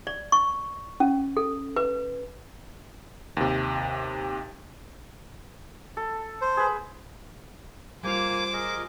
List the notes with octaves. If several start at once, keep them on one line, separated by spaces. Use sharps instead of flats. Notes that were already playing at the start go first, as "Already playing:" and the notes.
D5
C#6
C#4
A4
B4
D#2 C3
A4
C5
G#4 B4
G3 A#3 F4 C5 G#5 D6
G#4 A#4 D#5